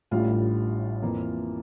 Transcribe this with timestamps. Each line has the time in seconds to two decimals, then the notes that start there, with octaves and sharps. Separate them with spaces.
0.11 A1 A2 G3 D4 F4
1.02 F2 E3 A#3